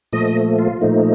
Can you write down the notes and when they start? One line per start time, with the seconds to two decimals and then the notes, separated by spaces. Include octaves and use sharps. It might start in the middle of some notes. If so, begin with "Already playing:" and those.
0.13 A#2 F3 A3 D#5
0.59 F4
0.81 A#2 F3 A3 D#4